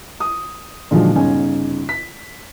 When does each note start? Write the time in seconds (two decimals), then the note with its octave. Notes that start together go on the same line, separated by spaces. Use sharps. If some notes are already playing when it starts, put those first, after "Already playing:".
0.20 D#6
0.91 A#2 D3 D#3 F3 F#3 G#3
1.15 G1 C#3 C#4 D#4 G#5
1.89 B6